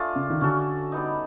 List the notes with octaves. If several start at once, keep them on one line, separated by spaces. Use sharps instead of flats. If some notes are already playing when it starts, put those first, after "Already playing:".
Already playing: A3 D4 F4 G#4
C#3
D#3
D3 C#4 F#4 A4
G3 B3 D#4